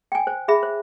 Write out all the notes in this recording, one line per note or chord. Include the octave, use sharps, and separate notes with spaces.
G5 G#5
C5
G#4 E5 B5
C5